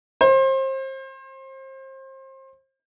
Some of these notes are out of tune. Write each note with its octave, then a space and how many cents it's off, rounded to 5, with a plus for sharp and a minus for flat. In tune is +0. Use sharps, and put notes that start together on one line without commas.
C5 +30